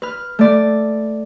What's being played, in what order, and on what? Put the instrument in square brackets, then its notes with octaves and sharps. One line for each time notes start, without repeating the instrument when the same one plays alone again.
[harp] B4 F6
A3 D5